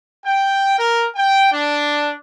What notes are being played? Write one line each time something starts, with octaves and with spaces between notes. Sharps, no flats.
G5
A#4
G5
D4